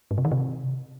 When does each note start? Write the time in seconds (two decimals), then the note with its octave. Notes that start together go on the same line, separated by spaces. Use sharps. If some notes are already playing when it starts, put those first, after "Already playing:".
0.11 G#2
0.18 C3
0.25 D#3
0.32 C3